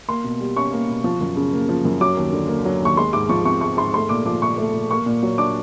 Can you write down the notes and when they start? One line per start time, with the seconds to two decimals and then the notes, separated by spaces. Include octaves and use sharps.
0.08 A#3 C6
0.24 B2
0.40 G3
0.56 C#4 C#6
0.72 A#3
0.89 B2
1.04 F3
1.21 F#2
1.37 C#3
1.53 A#3
1.69 F3
1.85 F#2
2.01 F#3 D6
2.17 D#2
2.33 D3
2.49 A#3
2.65 F#3
2.81 D#2 C#6
2.97 G#3 C6
3.13 G#2 D6
3.29 F3 C#6
3.45 C4 C#6
3.61 G#3 C#6
3.77 G#2 C6
3.94 A3 C6
4.09 A#2 D6
4.26 F3 D6
4.42 A#2 C#6
4.58 A3
4.74 A#2
4.91 A#3 C#6
5.06 A#2
5.23 F#3
5.38 D4 D6